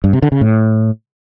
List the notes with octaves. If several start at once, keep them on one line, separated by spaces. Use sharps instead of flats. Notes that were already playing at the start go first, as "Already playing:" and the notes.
G2
C3
D3
C#3
A2